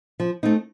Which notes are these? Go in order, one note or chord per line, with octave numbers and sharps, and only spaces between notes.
F3
A3 C4 D#4